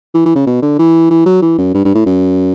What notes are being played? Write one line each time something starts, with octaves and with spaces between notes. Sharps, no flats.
E3
E3
C#3
B2
D3
E3
E3
F#3
E3
F#2
G2
G2
A2
F#2